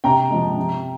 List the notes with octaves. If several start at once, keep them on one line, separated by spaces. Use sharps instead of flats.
C3 G5 A#5
F3 G#3
C3